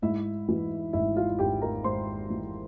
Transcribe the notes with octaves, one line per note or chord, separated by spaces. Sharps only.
G#2 E4 E5
E3
G#1 E4 E5
F4 F5
G#1 G4 G5
A#4 A#5
G#2 C5 C6
E3